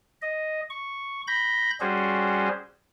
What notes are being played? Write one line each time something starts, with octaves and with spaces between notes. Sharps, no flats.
D#5
C#6
B5 G6 A#6
G3 C#4 F#4 G#4 C5